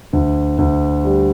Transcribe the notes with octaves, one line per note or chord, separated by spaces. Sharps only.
D2
D2
G3